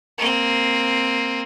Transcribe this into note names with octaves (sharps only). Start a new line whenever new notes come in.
A#3 C4